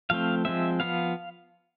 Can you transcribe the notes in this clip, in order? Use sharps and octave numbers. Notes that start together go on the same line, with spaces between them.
F3 A3 C4 F5
F3 G#3 C4 E5
F3 B3 F5